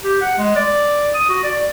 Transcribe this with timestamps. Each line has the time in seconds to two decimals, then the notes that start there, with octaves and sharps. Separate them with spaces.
0.03 G4
0.21 F#5
0.38 G#3
0.56 D5
1.14 D#6
1.29 F#4
1.44 D5